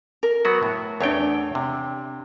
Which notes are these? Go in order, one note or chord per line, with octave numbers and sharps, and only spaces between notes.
A#4
F#3 B3 F#4
A2
E2 A3 D4 C#5 G5
C3